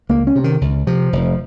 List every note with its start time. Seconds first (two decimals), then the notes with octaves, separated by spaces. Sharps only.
0.09 C#2 A#3
0.27 C#4
0.36 C3
0.44 D#3
0.61 C#2
0.87 C3 F3
1.13 F1